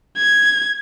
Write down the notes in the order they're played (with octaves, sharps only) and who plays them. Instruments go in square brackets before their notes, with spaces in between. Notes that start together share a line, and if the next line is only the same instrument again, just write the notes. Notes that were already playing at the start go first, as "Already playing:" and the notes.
[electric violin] G#6